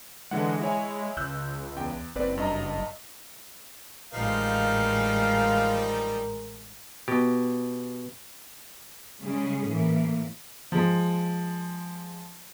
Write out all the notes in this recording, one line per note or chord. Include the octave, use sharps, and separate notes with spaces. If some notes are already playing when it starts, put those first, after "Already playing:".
D3 E3 G#3 F#5
E4 C#5 G#5
C#2 E6 F#6 G6
E2 G5
F#1 C4 B4 D5
G2 D#5 A#5
A1 F3 G3 G#3 D#4 A#4 F5
B2 G4
C#3 G3 G#3 C#4 G#4
A2 E3 A#3
F3 G#3